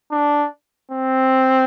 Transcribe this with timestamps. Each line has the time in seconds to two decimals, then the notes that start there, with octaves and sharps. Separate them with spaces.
0.12 D4
0.91 C4